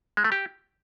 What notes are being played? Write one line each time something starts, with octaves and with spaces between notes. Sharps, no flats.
G#3
A3
G4